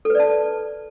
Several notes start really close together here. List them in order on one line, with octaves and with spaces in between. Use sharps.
A4 B4 D5 A5